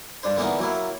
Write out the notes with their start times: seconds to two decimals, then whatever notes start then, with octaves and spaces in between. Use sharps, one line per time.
0.23 G2 D4 C5
0.37 D3 E3 A#3 B3 D#4
0.59 F#3 A#3 E4